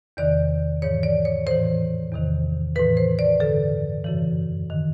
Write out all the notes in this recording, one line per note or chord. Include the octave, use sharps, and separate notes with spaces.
E2 C3 D#3 D5
G#2 E3 C#5
D5
C#5
A2 E3 C5
E2 C3 D#3
A2 E3 B4
C5
D5
G2 D3 A4
F#2 C#3 E3
D#3